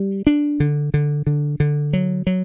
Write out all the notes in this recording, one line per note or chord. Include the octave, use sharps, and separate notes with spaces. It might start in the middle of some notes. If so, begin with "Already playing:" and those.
Already playing: G3
D4
D3
D3
D3
D3
F#3
F#3